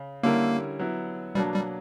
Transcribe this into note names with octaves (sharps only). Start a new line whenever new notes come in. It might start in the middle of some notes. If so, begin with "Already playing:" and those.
Already playing: C#3
D3 G3 A#3 C#4 E4 A#4
F#3 B3 E4
B2 F#3 G3 A#3 D4
G3